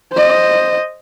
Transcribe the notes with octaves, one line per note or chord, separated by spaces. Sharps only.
C5 D#5